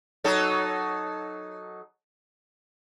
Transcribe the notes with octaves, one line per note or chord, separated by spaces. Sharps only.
F#3 D#4 A4